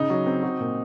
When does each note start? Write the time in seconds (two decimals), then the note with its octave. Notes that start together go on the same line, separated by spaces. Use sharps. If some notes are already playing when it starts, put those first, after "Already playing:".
Already playing: C#3 D#4
0.10 F#3
0.26 C4
0.43 F#4
0.60 A#2